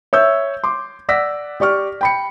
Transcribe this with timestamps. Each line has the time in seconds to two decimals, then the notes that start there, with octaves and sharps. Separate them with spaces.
0.13 C#5 E5 E6 G6
0.64 C6 D6
1.09 D5 F#5 E6 A#6 B6
1.60 G4 D5 C#6 F6
2.01 G5 B5 C#7